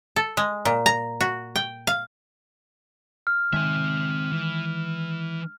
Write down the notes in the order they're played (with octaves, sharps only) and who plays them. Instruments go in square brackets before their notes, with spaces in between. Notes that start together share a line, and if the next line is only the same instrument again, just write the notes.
[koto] A4
G#3
A#2
A#5
F#4
G5
F5
[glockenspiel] F6
[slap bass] D#3 G#3 [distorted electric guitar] C4 E5
[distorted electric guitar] E3